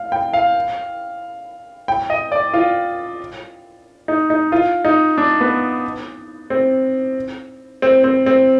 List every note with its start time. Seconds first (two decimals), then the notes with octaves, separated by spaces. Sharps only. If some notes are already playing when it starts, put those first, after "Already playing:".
Already playing: F5
0.12 G5
0.33 F5
1.88 G5
2.10 D#5
2.32 D5
2.54 F4
4.08 D#4
4.30 D#4
4.52 F4
4.85 D#4
5.18 D4
5.41 B3
6.50 C4
7.82 C4
8.04 C4
8.26 C4